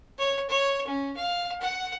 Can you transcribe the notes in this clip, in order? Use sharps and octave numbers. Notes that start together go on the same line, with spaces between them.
C#5
C#5
C#4
F5
F#5